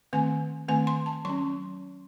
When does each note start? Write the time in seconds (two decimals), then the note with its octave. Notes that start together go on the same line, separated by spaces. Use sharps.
0.13 D#3 A3 C4 G#5
0.68 D#3 A3 C4 G#5
0.87 C6
1.06 A5
1.25 F#3 C#4 C6